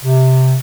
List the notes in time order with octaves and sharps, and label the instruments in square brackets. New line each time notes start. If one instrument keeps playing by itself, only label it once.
[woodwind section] C3